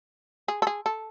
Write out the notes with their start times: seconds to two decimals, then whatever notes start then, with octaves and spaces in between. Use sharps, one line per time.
0.48 G#4
0.62 A4
0.67 G#4
0.86 A4